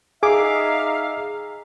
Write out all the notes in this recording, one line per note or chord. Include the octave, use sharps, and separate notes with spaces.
D#4 G#4 E5 F5 D6